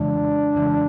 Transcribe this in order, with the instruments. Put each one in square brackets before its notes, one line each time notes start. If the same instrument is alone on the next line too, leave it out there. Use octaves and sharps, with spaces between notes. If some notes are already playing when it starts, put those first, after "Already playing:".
Already playing: [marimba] F2 C#3 E3 G#3 [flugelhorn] D4
[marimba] F2 C#3 E3 G#3